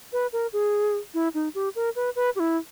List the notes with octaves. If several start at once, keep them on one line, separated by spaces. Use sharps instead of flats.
B4
A#4
G#4
E4
D#4
G4
A#4
B4
B4
G4
E4